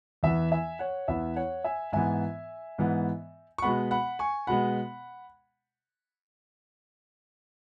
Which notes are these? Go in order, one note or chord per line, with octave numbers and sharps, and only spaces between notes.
E2 E3 B3 E5
E5 G#5
C#5 F#5
E2 E3 B3 E5
C#5 F#5
E5 G#5
G#2 E3 B3 E5 G#5
G#2 E3 B3
C#6
B2 G#3 B3 F#5 B5
F#5 B5
G#5 C#6
B2 G#3 B3 F#5 B5